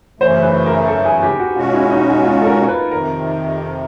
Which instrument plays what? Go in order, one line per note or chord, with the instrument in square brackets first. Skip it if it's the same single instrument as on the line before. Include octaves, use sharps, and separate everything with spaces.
[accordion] F#2 C#3 E3 A3 [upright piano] C5
[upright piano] B4
A#4
A4
G#4
G4
F#4
[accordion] B2 G#3 C#4 F#4 [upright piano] F4
[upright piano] E4
D#4
D#4
F4
A4
A#4
B4
[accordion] F2 C3 D#3 [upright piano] A#4